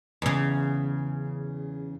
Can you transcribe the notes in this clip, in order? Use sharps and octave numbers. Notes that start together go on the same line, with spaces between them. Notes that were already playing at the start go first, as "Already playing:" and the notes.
E2 C#3